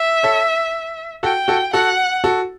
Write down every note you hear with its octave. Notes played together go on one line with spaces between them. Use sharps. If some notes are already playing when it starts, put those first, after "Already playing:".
Already playing: E5
A4 C#5
F#4 A4 G5
F#4 A4
F#4 A4 F#5
F#4 A4